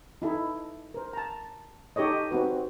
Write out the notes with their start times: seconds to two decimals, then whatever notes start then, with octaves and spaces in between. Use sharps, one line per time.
0.22 D#4 E4 A4
0.94 A#4 C5
1.13 A5 A#5
1.96 D#4 G4 A4 C#5 D#5
2.31 C4 D#4 F#4 B4